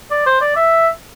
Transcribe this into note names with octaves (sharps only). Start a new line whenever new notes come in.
D5
C5
D5
E5